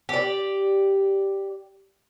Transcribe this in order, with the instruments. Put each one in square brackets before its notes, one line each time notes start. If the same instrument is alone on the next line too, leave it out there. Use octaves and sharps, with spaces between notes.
[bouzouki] G4 D5